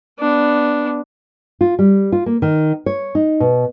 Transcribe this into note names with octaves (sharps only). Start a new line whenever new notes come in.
B3 D4
F4
G3
F4
A#3
D#3
C#5
D#4
B2